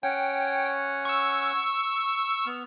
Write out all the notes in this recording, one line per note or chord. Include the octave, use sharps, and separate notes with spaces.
C#4 C#5 F#5 G5
C#6 E6
B3 F6